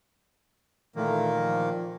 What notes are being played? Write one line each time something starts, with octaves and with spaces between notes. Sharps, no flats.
A#2 D#3 E3 A3 A#3
F3